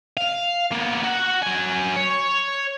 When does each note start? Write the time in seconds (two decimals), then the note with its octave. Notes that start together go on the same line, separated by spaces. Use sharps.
0.17 F5
0.72 A#3 B3
1.03 F#4 F#5
1.42 F#3 G#5
1.96 C#5